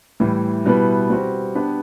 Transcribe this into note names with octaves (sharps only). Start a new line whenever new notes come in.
A2 E3 G3
B2 G3 B3 E4 B4
G3 C4 F#4
B3 D4 G4 B4